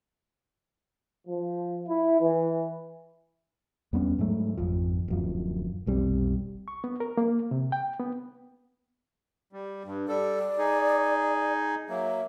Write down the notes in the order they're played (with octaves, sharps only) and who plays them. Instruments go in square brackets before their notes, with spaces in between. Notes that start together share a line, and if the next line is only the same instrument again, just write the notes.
[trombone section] F3
E4
E3
[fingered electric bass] E2 G3 B3 C#4
G#2 F#3 A3
G#1 F2 F3
D1 F#2 F3
F1 B1 G3 C4
[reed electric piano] C#6
B3
A#4
A#3
C3
G5
B3
[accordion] G3
G2
[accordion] G3 A4 [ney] D5
[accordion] D#4 G#4
[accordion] F#3 A#3 [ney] E5